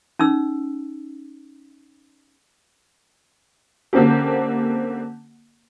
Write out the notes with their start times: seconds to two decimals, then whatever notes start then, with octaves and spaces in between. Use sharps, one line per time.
0.19 C#4 D#4 E6
3.93 D3 A#3 C4 C#4 G4